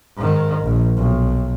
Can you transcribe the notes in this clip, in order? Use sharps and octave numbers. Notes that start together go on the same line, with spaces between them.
G#2 D#3
A#1
B1